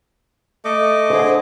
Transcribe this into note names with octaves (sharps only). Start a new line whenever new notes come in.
A3 D#5 D6
D3 G#4 C5